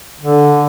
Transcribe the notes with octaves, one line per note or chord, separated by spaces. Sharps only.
D3